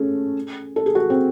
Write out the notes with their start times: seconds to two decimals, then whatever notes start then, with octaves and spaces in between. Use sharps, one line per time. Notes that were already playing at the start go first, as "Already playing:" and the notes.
Already playing: A3 C#4 G#4 A4
0.76 A4
0.86 G#4
0.95 F#4
1.10 C4